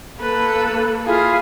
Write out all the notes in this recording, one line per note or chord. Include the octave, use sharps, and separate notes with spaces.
A#3 A4 B4
E4 F4 G#4 F5